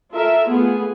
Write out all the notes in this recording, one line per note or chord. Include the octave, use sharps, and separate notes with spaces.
F4 A4 A#4 E5
A3 B3 F4 G#4